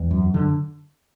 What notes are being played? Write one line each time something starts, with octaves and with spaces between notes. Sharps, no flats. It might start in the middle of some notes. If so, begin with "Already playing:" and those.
Already playing: E2
F#2
D3